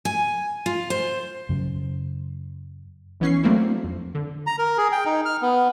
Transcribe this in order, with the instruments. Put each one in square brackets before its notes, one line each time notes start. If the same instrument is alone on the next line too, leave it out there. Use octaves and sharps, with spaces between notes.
[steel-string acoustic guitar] G#5
F4
C5
[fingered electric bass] F#2 C#3 F#3
[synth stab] A#1 E3 B3 C#4 C#6 C7
F#3 A3 A#3 C4 D4 E4
F2
D3
[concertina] A#5
A#4
G#4
G5
D#4
F6
B3